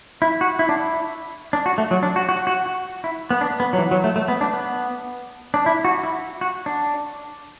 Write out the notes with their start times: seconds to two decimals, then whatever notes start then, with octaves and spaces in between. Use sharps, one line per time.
0.22 E4
0.41 F#4
0.59 E4
0.69 D4
0.77 E4
1.53 D4
1.66 F#4
1.78 A3
1.91 F#3
2.03 D4
2.16 F#4
2.29 F#4
2.47 F#4
2.66 F#4
3.04 E4
3.30 B3
3.41 D4
3.60 B3
3.73 F#3
3.78 E3
3.91 F#3
4.04 A3
4.16 A3
4.28 B3
4.41 D4
4.54 B3
5.54 D4
5.66 E4
5.85 F#4
6.03 E4
6.41 F#4
6.66 D4